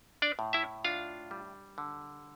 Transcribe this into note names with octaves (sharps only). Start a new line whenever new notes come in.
D4 D5
A2
E4 E5
D4 F4 F5
G3
D3